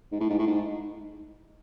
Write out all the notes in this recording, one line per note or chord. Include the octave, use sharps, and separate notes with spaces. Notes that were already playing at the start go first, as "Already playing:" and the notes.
G#2
A2
G#2
A2
G#2